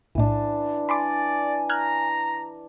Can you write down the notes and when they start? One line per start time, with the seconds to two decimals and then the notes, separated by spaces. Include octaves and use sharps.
0.15 B1 A2 E3 D4
0.89 D5 G#5 B5 C6 D6
1.70 A#5 F6 F#6 G#6